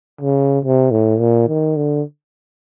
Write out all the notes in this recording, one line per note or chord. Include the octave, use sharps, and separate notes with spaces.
C#3
C3
A2
A#2
D#3
D3